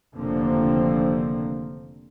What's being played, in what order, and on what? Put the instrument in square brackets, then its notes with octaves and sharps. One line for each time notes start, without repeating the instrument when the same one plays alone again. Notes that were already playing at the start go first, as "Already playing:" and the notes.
[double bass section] F1 D#2 D3 F3 A#3 C4